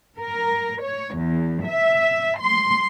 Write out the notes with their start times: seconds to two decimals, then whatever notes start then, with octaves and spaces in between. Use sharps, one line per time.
0.18 A#4
0.82 C#5
1.17 E2
1.65 E5
2.40 C6